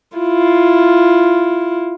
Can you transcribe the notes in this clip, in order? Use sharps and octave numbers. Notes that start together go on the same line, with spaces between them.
E4 F4